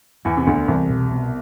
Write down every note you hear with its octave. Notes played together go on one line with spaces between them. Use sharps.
E2 E3 B3
C3
D2 D3 B3
C2 C3 E3
B2
B3